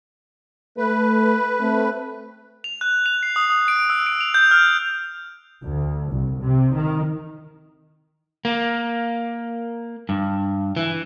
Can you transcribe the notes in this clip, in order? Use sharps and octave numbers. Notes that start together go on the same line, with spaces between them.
A3 B4
A3 C4
F7
F#6
F7
C7
D#6
D#6
D7
E6
D7
F7
G6
F6
D2
C2
C3
D#3
A#3
G2
E3